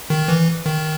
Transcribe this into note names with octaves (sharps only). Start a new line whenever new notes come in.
D#3
E3
D#3